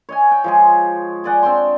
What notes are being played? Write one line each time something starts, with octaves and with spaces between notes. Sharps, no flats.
C#5 D#5 G#5
G5
F3 G#3 G#4
G#4 D5 F#5 G5
C4 D4 G5 C6